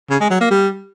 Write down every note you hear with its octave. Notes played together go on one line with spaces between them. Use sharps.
C#3
G#3
F#3
A#3
G3